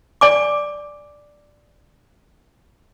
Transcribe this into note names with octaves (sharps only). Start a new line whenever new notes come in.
D5 G#5 D6